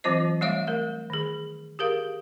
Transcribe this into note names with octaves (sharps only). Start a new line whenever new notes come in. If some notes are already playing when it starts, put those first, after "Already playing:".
E3 F#3 C4 F4 C5 D#5
G3 A3 C#5 E5 F5
A3 A#4
D#3 G#4
G4 G#4 A#4 F5